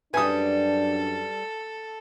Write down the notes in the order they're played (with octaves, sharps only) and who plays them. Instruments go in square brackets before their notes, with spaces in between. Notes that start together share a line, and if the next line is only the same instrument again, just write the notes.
[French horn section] F#2 D4 [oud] G3 B4 [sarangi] A4 [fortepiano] G#5 D#6